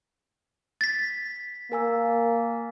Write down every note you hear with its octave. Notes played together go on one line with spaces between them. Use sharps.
A6 B6
A#3 A#4 G#5 E6